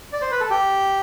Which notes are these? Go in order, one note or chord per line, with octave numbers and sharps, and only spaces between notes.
D5
C5
B4
A4
G4